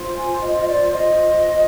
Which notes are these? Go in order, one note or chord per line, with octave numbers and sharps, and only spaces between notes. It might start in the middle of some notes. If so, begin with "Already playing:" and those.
Already playing: F4 C5
G#5
D#5
D#5
D5
D#5